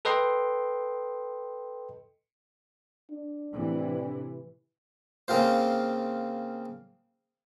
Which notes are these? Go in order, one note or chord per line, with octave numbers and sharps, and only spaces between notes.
A4 B4 D#5 G5 C6
D4
A2 C3 E3
C#3 A#3 C4 F4 C5